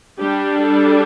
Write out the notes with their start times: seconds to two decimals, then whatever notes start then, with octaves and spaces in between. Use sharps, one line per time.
0.18 G3 D4 G4
0.59 A4